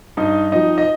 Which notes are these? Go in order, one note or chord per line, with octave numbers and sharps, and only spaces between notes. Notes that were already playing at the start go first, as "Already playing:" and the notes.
G2 D#4 D#5
F3 C4 D#4 D#5
D#5